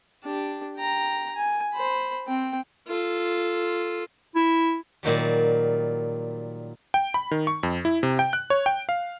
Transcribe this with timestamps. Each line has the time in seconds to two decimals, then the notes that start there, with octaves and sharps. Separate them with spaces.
0.24 D4 G4
0.77 G5 A#5
1.36 G#5
1.74 C5 B5
2.27 C4 G5
2.88 F4 A4
4.35 E4
5.03 A#2 D#3 F#3 G3
6.94 G5
7.14 B5
7.31 D#3
7.47 C#6
7.63 F2
7.85 E4
8.03 C3
8.19 G5
8.33 F#6
8.50 C#5
8.66 G5
8.89 F5